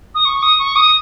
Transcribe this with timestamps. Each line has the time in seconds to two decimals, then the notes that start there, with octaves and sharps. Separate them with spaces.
0.15 D#6
0.25 C#6
0.42 D#6
0.59 C#6
0.76 D#6